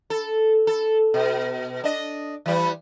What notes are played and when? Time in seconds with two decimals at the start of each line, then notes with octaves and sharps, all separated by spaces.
0.10 A4
0.67 A4
1.14 B2
1.84 D4 D#5
2.46 E3 G3